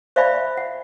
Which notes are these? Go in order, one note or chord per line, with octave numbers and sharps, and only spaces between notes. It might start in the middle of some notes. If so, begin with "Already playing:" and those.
C5 D5 E5 F5 G#5 B5
F#5